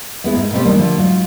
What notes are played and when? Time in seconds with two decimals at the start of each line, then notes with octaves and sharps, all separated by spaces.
0.24 G#3 B3 E4
0.36 G#2
0.53 B2 A3 C4 E4 G4 C5
0.65 D#3 G3 A#3 D4
0.79 D3 F3 A3
0.97 G#2 F#3 F4